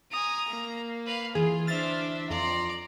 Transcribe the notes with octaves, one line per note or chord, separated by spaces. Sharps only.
G#5 A#5 D#6
A#3
B4 F5
D2 E3 F4 G#4
D4 C5 E5 F6 A6
F2 D5 A#5 C6